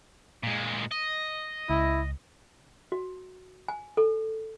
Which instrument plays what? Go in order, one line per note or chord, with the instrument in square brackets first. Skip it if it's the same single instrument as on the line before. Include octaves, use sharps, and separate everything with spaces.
[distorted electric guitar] A#2 G#3
D#5
[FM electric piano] C#2 [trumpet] E4
[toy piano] F#4
G#5
A4